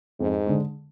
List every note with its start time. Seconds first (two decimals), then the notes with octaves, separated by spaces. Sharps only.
0.20 F2 G#2
0.47 D3 G#3